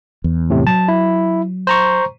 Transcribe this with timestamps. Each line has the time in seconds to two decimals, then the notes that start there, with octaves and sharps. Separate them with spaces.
0.24 E2
0.50 A2 C3
0.67 F#3 A5
0.88 E4
1.67 C5 A#5 C#6